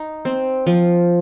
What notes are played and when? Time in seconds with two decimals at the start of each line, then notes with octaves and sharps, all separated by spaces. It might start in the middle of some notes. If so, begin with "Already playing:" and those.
Already playing: D#4
0.25 C4
0.67 F3